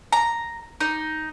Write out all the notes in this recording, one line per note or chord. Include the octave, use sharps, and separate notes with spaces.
A#5
D#4